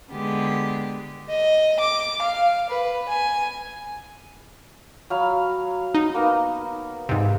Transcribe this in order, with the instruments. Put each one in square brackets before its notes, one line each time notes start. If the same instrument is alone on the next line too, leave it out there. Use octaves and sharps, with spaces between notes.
[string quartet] D3 G#3 B3 G4
[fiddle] D#5
D6
F5
B4
G#5
[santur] F#3 F5 B5
[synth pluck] D#4
[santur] A#3 B3 A#4
[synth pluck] G#2 C3